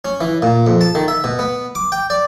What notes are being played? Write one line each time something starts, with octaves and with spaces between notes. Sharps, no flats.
C#4
E3
A#2
F2
A5
D#3
E5
B2
B3
D6
G5
D5